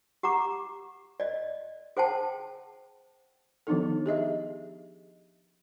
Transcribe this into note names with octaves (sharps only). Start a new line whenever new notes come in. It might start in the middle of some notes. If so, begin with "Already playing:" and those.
G4 F#5 A#5 D6
D5 D#5
G#4 C5 F#5 G5 A5
D#3 F3 B3 D4 D#4 A4
G4 G#4 D#5 E5